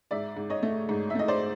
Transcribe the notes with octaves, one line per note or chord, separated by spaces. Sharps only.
G#2 D5 E5
G#2
C#5 D#5
A3
G#2
E5
A3 D#5
C5 D5